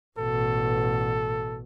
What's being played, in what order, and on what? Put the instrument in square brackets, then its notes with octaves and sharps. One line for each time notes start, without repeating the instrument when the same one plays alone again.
[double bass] A1 B2 [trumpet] A4